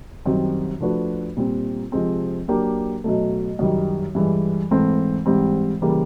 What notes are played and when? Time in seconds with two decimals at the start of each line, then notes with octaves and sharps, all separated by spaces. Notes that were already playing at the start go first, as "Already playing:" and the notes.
0.25 F#2 D#3 G3 C4
0.80 F3 A3 D4 F#4 B4
1.37 A#2 G3 C4
1.92 C3 F3 G#3 C4
2.48 F#3 A#3 D4 G4
3.04 B2 F#3 A3
3.59 F#2 D#3 G3
4.15 G2 E3 G#3
4.71 G#2 E3 A3 C4
5.26 G#2 E3 G3 C4
5.82 C#3 E3 G3 A#3